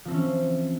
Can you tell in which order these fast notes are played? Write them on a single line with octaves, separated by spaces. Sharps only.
F3 C4 E3 C#4